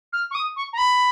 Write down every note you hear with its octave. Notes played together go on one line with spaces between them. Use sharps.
F6
C#6
D#6
C#6
A#5
B5